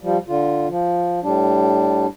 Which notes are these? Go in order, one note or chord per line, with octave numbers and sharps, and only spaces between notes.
F3 G3
D3 F4
F3
A2 G3 D4